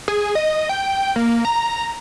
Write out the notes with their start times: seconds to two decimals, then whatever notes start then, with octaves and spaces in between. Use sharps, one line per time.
0.08 G#4
0.35 D#5
0.69 G5
1.16 A#3
1.45 A#5